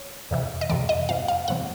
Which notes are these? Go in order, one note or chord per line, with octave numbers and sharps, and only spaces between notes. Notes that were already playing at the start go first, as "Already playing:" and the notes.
Already playing: C#5
F2 C3 E3
D#5
F2 C3 E3 D5
D#5
F2 C3 E3 F5
F5
F2 C3 E3 F#5